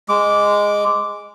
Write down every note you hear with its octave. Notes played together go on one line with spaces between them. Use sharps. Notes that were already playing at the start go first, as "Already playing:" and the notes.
G#3 D6